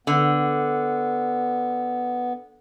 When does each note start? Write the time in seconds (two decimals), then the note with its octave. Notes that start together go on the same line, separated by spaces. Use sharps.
0.07 D3 B3